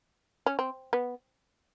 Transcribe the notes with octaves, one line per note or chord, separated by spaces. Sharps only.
C#4
C4
B3